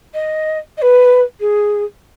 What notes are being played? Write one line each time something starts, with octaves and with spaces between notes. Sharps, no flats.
D#5
D#5
B4
G#4